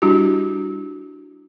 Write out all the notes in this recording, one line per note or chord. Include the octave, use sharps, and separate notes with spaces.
G3 D4 E4 F#4 G4